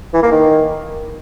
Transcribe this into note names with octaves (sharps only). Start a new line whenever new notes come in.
E3
A#3
D#3